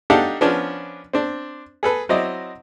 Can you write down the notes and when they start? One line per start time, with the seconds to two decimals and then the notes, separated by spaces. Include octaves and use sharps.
0.10 D4 D#4 G4 A4 F5 F#5
0.41 F3 B3 C#4 D4
1.13 C4 D4
1.83 G#4 A4 B4
2.09 F#3 C4 E4 D5 D#5